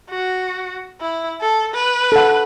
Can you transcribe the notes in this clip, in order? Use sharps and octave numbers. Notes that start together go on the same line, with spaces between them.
F#4
E4
A4
B4
A4 F#5